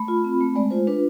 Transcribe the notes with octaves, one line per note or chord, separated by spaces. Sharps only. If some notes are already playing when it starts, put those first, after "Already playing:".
Already playing: A3 B5
F4
C4
A3
G#3 D5
F4 C5
D4 B4